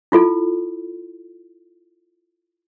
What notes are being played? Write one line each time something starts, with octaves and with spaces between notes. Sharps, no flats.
E4 F4 A4